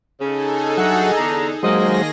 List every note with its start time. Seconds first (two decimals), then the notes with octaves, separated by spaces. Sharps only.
0.19 C#3 D#4 G#4 A4
0.78 G2 F#3 F#4 E5 F#5
1.17 E2 D3 A#5
1.63 D#3 F#3 G#3 A#3 G#4 C5 D#5 A#6